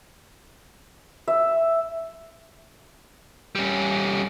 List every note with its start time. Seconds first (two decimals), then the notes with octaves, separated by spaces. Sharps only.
1.28 E5
3.55 G3 C#4